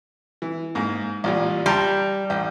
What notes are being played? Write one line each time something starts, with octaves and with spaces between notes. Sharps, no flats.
E3
G#2 A#3
A1 A#2 G3
G3 A5 A#5 C6
A1 G5